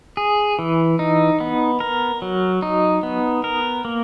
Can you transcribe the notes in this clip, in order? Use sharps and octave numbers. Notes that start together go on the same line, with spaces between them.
G#4
E3
D#4
B3
A#4
F#3
D#4
B3
A#4
A#3